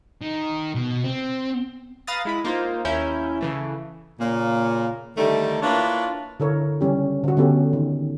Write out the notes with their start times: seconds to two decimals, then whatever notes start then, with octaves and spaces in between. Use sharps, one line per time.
0.21 D#3
0.75 B2
1.04 C4
2.07 B4 F5 A#5 D#6 A6
2.25 G#3 E4 B5
2.45 A#3 D#4 F4 C5
2.85 D#2 C#4 E4 A#4 G6
3.41 C#3 E3 A3
4.20 A#2 C#3 A#3
5.17 D3 D#3 G3 A3
5.62 A#3 D4 E4 F4 B4 C#5
6.40 D3 E4 A4 A#4 C#5
6.81 C#3 E3 G3 C#4 G4
7.24 D3 F#4
7.37 D3 A3 B3 C#4 G4 A4
7.73 D#3